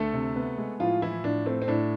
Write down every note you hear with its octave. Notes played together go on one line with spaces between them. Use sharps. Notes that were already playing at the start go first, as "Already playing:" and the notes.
Already playing: D2 A3 A4
C3
B3
G#3
A2 F3 F4
E3 F3 E4
A2 D4
A3 C4
C4
A2 D4